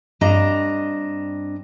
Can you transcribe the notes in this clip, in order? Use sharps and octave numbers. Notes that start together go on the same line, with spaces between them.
G2 C4 D4 D#5 A#5